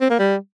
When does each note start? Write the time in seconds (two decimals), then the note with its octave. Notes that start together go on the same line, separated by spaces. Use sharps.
0.01 C4
0.10 A#3
0.19 G3